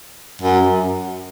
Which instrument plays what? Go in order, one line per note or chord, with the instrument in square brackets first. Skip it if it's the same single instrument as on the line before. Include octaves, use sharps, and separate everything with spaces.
[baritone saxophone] F#2